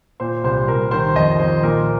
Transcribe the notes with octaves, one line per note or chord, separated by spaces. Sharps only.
A#2 C5
C2 C5
C2 A#4
D#3 C5
F2 D#5
F2 C5
A#2 A#4